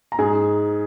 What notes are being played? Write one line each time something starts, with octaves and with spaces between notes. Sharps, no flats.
A#5
G#2 G#4 G#5